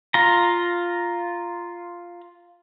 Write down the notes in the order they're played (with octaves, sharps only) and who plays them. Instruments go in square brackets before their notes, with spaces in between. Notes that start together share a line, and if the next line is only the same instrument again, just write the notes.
[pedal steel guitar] F4 A#5